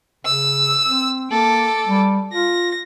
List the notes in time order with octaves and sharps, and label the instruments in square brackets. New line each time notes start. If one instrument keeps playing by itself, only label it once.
[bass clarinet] C#3 [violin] E6
[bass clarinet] C4
[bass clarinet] A#3 [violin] A4 D6
[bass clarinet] G3
[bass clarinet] F4 [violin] A#6